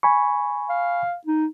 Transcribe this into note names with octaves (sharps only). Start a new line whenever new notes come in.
G#5 B5 C#6
F5
D#4